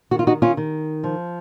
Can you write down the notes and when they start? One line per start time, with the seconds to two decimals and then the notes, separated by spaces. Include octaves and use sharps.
0.11 D#3 F#4
0.19 F4
0.27 D#4 F#4
0.42 C#4 F4
0.57 D#3
1.04 F3